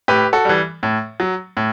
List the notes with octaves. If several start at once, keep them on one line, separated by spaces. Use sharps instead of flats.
A2 G4 B4
F#4 A4
E3 G3
A2
F#3
A2